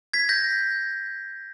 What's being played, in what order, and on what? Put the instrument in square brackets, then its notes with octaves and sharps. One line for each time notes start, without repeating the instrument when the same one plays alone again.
[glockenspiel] G#6 B6
G6 A#6